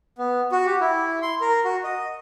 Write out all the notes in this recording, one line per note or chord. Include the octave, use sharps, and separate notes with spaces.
B3
F#4
G4
E4
C6
A#4
F#4
D#5